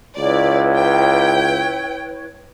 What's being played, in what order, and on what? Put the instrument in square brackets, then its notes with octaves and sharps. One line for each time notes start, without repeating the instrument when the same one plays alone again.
[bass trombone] C#2 [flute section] E4 B4 C#5 [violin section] D5
[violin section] G5